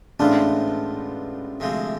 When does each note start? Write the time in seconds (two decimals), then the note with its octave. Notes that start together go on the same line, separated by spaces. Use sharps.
0.20 A1 A2 G#3 B3 D4 F4
1.60 D2 C3 F3 G#3